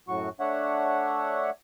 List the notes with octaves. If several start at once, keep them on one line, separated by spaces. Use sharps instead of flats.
F#2 A2 F#3 F#4 C#6
A3 D4 C#5 E5 F#5